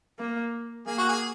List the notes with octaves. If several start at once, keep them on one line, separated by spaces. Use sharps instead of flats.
A#3
A#3 G#4
F#4
G#4